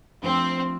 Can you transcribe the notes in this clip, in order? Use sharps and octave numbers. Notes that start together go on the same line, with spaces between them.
F3 A3 C4 D4